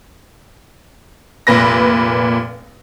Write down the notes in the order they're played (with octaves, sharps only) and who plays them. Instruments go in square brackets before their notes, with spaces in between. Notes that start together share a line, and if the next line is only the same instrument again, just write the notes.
[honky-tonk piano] F1 A#2 B4 A#6